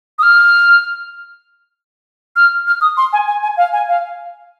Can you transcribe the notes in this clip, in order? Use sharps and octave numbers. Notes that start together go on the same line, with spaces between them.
D#6
F6
F6
F6
D#6
C6
G#5
G#5
G#5
F5
G#5
F5